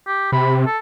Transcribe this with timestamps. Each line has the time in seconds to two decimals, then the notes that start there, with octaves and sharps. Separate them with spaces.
0.07 G4
0.32 C3 B5
0.66 A4